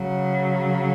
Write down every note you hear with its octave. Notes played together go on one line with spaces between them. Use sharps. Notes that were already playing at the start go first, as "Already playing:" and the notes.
Already playing: C#3 F#3